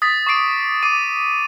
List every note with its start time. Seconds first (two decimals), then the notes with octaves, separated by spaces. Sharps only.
0.02 D#6 A6 B6
0.27 C#6 D6 C7 D7
0.83 D6 C7 D#7